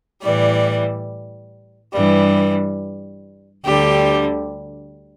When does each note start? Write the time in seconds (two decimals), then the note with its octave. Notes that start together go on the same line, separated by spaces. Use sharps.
0.22 A2 E3 G3 D5
1.93 G2 E3 G3
3.64 D2 D3 G3 G4